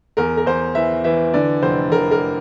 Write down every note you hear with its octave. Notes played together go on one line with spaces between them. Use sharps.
E2 A#4
A#4
E2 C5
E3 E5
E3 E5
D3 D5
F1 C5
F1 A#4
A#4